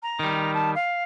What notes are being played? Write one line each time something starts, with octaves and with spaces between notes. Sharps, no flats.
A#5
D#3 G3
A5
F5